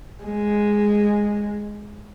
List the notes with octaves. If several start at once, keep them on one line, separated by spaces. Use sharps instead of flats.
G#3